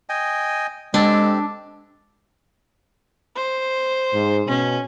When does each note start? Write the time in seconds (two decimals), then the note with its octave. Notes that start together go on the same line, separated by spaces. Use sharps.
0.09 D#5 G5 G#5
0.94 G#3 C4 D4 G4 A4
3.36 C5
4.13 G#2
4.47 B2 C#4